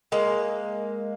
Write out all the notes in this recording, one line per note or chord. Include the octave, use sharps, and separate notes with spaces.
G#3 A#3